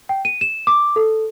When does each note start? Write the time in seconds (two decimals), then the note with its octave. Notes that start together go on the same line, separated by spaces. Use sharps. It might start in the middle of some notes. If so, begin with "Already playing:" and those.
0.09 G5
0.25 D#7
0.41 E7
0.67 D6
0.96 A4